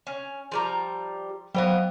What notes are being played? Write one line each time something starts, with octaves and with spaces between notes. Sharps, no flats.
C#4
F3 G3 A#5
F#3 B3 C5 D#5 F5 G5